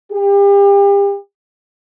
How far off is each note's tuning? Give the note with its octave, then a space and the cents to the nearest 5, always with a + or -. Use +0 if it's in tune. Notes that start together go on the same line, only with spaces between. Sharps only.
G4 +35